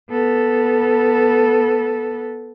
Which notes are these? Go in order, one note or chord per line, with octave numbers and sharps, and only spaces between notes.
B3 A4